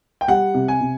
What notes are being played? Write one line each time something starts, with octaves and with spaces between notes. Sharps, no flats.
G5
G3 F#5
C3
G#5
C3